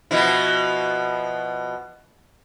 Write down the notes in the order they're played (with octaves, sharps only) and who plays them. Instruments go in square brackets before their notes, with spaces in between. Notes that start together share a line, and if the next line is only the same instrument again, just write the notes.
[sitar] B2 F3 E4